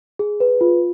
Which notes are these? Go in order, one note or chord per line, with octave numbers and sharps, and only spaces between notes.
G#4
B4
F4